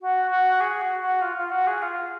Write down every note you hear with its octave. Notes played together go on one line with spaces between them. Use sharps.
F#4
F#4
G#4
F#4
F#4
F4
F4
F#4
G#4
F4